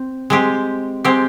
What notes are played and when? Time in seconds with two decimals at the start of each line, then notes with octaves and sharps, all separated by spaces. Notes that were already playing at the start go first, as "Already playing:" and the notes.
Already playing: C4
0.30 G#3 C4 G4
1.04 G#3 C4 G4